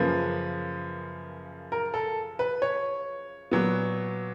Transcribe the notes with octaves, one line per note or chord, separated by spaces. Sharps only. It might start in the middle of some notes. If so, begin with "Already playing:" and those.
Already playing: F#2 C#3 F3 A#3 B4
A#4
A4
B4
C#5
A#2 F#3 B3